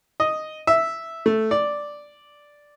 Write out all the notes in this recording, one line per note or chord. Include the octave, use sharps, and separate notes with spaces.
D#5
E5
A3
D5